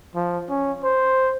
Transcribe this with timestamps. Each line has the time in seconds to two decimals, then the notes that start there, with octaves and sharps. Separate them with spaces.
0.15 F3
0.49 C#4
0.84 C5